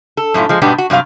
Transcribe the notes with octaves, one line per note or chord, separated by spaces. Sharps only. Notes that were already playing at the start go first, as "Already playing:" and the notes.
A4
F#2 A2 C#4 F4
F3 G#3
G#2 B2 G3 B3 D4 G4
F#4
G2 C3 F#3 F5